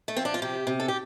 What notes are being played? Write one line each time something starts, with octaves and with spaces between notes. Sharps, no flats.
A3
F3 C4
D4
F4
C3 G4
C3
A4
G4